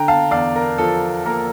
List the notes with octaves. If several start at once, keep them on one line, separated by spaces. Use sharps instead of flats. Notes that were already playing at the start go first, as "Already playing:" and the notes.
Already playing: D3 G5 A#5
F5 A5
E2 D5 F5
A#4
F3 A4
A#3 A#4